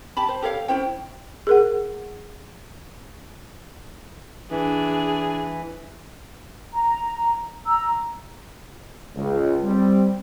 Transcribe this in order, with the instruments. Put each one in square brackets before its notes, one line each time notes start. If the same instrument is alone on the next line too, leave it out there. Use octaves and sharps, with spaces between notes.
[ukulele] G4 A5 B5
C5
G4 A4 C#5 F5
C#4 E4 C5 G5
[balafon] G#4 A#4 F#5
[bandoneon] E3 [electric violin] D4 G#4
[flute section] A#5
A#5 E6
[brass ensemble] C#2
G3 C4